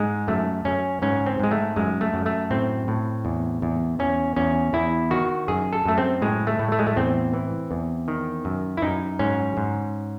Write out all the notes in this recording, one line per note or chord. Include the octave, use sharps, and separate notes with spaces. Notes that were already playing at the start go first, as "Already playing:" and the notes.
Already playing: G#2 G#3
F#2 A3
F#2 C#4
G#2 C#4
C4
G#2 G#3
A3
F#2 G#3
A3
F#2
A3
A2 C4
A2
E2
E2
E2 C#4
E2 C#4
E2 E4
D#3 F#4
F#2 G#4
A4
F#2 A3
C4
A2 G#3
A3
A2
A3
G#3
A3
E2 C4
E3
E2
D#3
F#2
E4
F#2 D#4
G#2 C#4
G#2